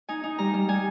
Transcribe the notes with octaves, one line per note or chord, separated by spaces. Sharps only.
D#4 G#5
D#4
G3 A#5
G3
G3 G#5